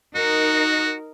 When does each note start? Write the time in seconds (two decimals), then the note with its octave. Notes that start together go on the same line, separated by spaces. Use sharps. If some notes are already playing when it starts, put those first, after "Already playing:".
0.15 D#4 F#4 A#4